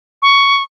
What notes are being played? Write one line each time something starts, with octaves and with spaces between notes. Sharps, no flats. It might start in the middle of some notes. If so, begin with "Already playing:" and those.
C#6